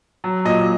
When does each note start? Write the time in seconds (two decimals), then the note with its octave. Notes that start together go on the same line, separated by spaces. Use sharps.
0.24 F#3
0.45 A#2 D#5